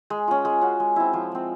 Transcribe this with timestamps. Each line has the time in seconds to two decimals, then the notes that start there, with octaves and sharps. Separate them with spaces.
0.10 G#3
0.28 C#4 F4
0.45 G#3
0.61 C#4 F#4
0.80 G#3
0.96 C4 E4
1.13 F3
1.32 G#3 C4